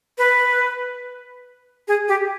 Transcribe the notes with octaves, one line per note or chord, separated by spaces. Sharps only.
B4
G#4
G4